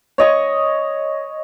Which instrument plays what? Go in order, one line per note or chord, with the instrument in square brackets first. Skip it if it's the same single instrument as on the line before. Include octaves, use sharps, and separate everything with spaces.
[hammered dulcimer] C#5 D#5 C#6